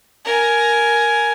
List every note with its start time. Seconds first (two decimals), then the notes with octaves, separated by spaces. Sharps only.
0.25 A#4 G#5